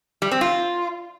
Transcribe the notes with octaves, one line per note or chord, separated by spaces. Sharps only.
G3
C4
F4